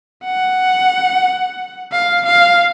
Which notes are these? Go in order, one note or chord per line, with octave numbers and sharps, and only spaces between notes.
F#5
F5
F5